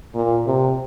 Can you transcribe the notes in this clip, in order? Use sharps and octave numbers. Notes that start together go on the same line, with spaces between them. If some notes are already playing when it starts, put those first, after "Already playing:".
A#2
C3